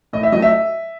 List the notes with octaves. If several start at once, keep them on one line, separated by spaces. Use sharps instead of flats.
A2 D#5
E5
F#3 A3 D#5
E5